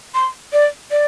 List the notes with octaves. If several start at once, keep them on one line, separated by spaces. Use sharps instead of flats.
C6
D5
D5